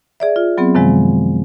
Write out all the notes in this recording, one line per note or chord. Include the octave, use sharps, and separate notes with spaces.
G#4 D5 E5
F4
F#3 B3 C4 G#4
F#2 C3 D#3 F3 G#3